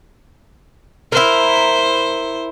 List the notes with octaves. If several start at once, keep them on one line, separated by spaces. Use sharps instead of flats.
E4 A#4 C5